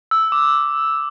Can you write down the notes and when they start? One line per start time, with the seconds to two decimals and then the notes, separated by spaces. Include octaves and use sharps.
0.11 E6
0.32 D6